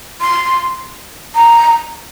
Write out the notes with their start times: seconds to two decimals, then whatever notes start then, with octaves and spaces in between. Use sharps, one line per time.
0.21 C6
1.35 A#5